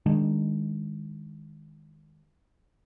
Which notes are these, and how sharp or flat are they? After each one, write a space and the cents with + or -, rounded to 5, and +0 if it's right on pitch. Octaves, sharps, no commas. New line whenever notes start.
D#3 +0 G#3 -15 D4 +0